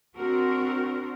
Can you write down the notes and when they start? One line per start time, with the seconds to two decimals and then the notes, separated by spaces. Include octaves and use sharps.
0.15 C4 D4 F#4 A#4